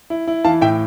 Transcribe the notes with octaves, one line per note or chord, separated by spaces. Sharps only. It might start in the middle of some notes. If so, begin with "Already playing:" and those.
E4
E4
E3 F5 A5
A2 E5 G5